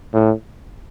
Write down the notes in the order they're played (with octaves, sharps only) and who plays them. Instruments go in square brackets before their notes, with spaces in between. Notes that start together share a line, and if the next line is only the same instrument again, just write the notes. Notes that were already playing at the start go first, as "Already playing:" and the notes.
[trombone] A2